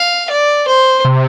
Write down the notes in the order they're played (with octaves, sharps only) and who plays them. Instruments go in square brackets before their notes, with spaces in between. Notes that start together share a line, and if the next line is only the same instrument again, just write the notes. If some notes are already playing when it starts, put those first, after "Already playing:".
Already playing: [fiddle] F5
D5
C5
[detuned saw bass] C3